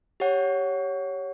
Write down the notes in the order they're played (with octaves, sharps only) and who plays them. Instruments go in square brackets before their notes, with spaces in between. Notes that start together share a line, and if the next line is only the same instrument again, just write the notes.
[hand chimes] G4 C#5 F#5